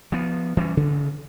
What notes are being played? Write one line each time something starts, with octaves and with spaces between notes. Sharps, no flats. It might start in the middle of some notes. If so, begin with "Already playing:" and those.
F3 B3
E3 G3 C#4
A1 C#3